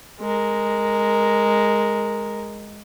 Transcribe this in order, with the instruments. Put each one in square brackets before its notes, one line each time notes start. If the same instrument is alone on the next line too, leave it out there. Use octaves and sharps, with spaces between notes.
[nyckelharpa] G#3 A#4